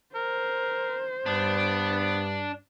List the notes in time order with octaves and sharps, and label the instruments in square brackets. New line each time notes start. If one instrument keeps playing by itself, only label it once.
[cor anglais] A#4 [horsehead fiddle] C5
[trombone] G2 [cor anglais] B3 [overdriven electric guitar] D4